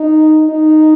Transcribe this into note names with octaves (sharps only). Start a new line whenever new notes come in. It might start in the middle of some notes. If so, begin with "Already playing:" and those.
Already playing: D#4
D#4